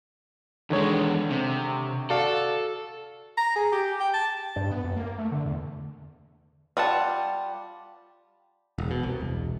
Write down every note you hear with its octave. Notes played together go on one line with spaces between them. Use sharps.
E2 D3 D#3 G#3 C#5
C3
F#4 A4 D5 F5
A#5
G#4
G4
G5
A5
G2
B3
F#2
A#3
A3
D3
E2
G3 F4 F#5 A5
E1
B2
C2
E1